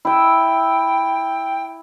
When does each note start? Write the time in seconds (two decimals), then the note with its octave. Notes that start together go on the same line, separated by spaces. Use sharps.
0.05 E4 E5 G5